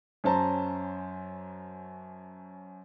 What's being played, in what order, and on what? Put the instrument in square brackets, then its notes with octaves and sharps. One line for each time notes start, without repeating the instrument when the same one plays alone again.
[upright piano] F#2 C#4 C5 A5 A#5